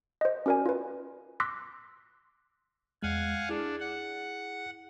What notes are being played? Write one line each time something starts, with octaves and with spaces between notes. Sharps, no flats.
C5 D#5
C#4 F#4 A#4 D5 G#5
F4 B4
C6 D6 E6 F#6 A#6 B6
E2 G#3 F5 F#5 G#5
D4 E4 G#4
F#5